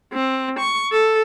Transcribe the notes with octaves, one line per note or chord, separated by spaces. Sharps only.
C4
C#6
A4